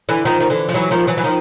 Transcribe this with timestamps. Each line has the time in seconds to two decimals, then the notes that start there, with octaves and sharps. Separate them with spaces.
0.09 D3 E3
0.25 D#3 F3
0.40 D#3
0.50 D3 E3
0.69 F3
0.74 E3 F#3
0.91 D#3 F3
1.07 E3 F#3
1.17 E3
1.24 D#3 F3